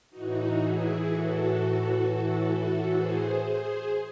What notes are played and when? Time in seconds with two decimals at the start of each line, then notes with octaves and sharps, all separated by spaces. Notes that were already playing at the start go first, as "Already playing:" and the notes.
0.10 A2 E3 D#4 F#4
0.58 E4 G#4
1.04 F#4 A4
2.92 G#4 C5
3.39 G#4 C5